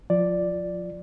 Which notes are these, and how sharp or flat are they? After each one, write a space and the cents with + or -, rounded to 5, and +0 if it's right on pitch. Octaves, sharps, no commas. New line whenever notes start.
F3 +35 F4 -10 D5 +0